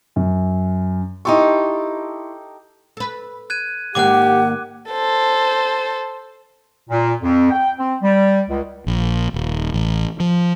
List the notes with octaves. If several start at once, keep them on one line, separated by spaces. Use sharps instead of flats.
F#2
D#4 E4 G4 A4 C6 C#6
A4 B4
F#6 G#6 D#7
G#2 D#3 A#3 G4 F#5 D6 F#6
A4 C5
A#2
F2
G5
C4
G3
C#2
A#1
D#1
A1
F3